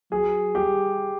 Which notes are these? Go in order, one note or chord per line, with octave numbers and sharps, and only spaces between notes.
F#3 G#4
G3 G4